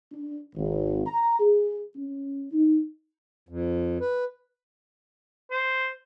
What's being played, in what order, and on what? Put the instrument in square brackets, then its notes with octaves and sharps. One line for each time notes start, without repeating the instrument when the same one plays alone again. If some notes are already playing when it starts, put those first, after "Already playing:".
[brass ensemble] D4
G#1
A#5
G#4
C#4
D#4
[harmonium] F2
B4
[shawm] C5